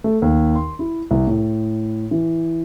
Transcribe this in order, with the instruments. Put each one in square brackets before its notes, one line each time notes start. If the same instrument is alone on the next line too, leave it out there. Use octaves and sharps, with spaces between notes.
[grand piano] A3
D#2
C6
E4
C2
A2
E3